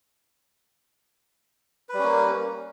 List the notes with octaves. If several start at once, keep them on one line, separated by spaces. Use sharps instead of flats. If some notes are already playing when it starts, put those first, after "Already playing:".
G3 A#3 C#4 B4